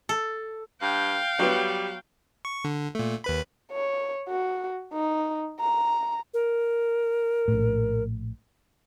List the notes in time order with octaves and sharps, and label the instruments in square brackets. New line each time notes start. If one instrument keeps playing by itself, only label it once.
[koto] A4
[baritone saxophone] G2 [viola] F5 G5
[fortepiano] F#3 B3 [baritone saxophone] G3
[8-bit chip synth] C#6
D3
A#2 A3
D#2 B4 B5
[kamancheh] C#5
F#4
D#4
A#5
[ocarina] A#4
[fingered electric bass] A#1 A2